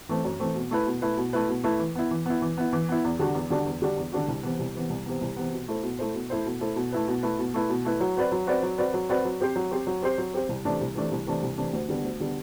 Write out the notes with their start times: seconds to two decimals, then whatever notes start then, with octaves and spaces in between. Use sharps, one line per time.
0.09 E3 A3 C4
0.25 F#2
0.40 E3 A3 C4
0.55 B2
0.71 A3 E4 B4
0.86 B2
1.02 A3 E4 B4
1.17 B2
1.33 A3 E4 B4
1.49 B2
1.64 A3 E4 B4
1.79 E3
1.95 B3 E4
2.11 E3
2.26 B3 E4
2.42 E3
2.57 B3 E4
2.73 E3
2.89 B3 E4
3.04 E2
3.19 D3 G3 D4 F#4
3.34 E2
3.50 D3 G3 D4 F#4
3.66 E2
3.82 D3 G3 D4 F#4
3.97 E2
4.12 D3 G3 D4 F#4
4.28 C2
4.43 C3 E3 B3
4.59 C2
4.75 C3 E3 B3
4.90 C2
5.06 C3 E3 B3
5.21 C2
5.36 C3 E3 B3
5.52 B2
5.68 A3 E4 A4 C5
5.83 B2
5.99 A3 E4 A4 C5
6.14 B2
6.30 A3 E4 A4 C5
6.46 B2
6.61 A3 E4 A4 C5
6.76 B2
6.92 A3 E4 B4
7.08 B2
7.23 A3 E4 B4
7.39 B2
7.54 A3 E4 B4
7.70 B2
7.85 A3 E4 B4
8.00 F#3
8.17 C4 F#4 B4 D5
8.32 F#3
8.47 C4 F#4 B4 D5
8.63 F#3
8.78 C4 F#4 B4 D5
8.94 F#3
9.09 C4 F#4 B4 D5
9.25 F#3
9.40 C4 G4 C5
9.56 F#3
9.71 C4 G4 C5
9.87 F#3
10.02 C4 G4 C5
10.18 F#3
10.33 C4 G4 C5
10.49 C2
10.65 C3 E3 A3 D4
10.81 C2
10.95 C3 E3 A3 D4
11.11 C2
11.27 C3 E3 A3 D4
11.43 C2
11.58 C3 E3 A3 D4
11.73 D2
11.89 D3 G3 B3
12.04 D2
12.20 D3 G3 B3